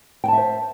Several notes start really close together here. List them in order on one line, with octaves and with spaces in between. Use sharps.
G5 A5 E5 C5